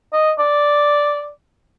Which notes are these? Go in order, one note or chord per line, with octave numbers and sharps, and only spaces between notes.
D#5
D5